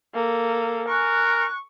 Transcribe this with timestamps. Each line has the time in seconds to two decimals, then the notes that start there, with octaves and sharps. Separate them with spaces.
0.14 A#3 A4
0.88 A#4 G#5 C#6 F#6